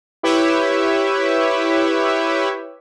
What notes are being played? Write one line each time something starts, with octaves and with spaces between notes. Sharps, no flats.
E4 G4 B4 C#5 E5